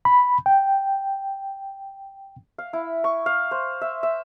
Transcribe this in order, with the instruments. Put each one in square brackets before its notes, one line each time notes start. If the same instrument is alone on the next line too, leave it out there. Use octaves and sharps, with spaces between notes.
[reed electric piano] B5
G5
[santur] F5
E4
C#6
F5
C5
E5
E5